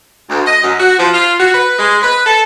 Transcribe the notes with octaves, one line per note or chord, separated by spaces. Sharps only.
D2
D#5
F#2
F#4
F3
F4
F#4
B4
G#3
B4
A4